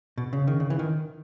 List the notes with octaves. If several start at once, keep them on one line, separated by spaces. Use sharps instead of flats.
B2
C#3
D#3
C#3
E3
D#3